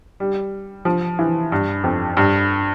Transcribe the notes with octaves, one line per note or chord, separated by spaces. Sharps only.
G3
F3
E3
G2
F2
G2